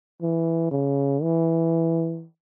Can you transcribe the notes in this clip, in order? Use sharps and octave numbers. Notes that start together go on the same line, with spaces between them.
E3
C#3
E3